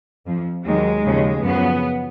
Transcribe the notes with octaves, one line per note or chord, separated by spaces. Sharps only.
F2 F3
D#2 D#3 F#3 G#3
D#2 C#3 F3
F#2 C#3 F3 B3